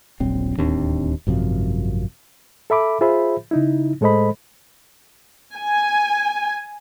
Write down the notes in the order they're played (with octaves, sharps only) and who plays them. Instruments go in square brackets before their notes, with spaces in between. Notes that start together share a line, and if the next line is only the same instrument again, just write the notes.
[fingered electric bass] D#1 A#1 F#3 C4
D1 D#2 C4 D4
G#1 F#2 C3 F3
[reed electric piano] A4 E5 B5 D6
F4 G#4 C5 E5 B5
C#3 D#4 E4
A2 G#3 A4 C5 D#5 B5
[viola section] G#5